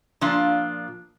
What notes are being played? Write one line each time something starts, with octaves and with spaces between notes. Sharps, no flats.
A#2 F3 D4 F4